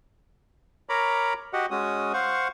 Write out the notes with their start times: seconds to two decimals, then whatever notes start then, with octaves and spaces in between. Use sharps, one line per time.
0.89 A#4 C#5 A#5 B5 D6
1.53 F#4 G4 D#5 F#5
1.71 G#3 C#4 F#4 D#6
2.13 C5 F5 F#5 C#6